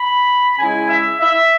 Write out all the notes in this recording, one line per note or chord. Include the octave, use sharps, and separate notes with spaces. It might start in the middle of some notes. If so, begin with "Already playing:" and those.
Already playing: B5
C#3 G#3 E4 G#5
E5
E5